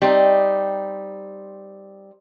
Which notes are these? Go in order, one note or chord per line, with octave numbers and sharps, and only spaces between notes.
G3 C4 D#4